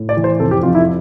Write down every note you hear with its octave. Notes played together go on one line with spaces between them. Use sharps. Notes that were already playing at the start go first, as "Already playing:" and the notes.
Already playing: A2
D5
E3
C5
F1 A4
G4
F2 F4
E4